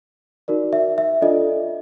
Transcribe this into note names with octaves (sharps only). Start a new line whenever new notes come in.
D#4 F#4 A#4 D5
E5
E5
D4 F4 A4 D5 D#5